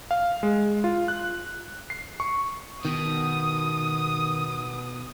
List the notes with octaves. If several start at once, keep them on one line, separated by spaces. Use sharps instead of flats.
F5
G#3
F4
F#6
C7
C#6
B2 D#3 D#6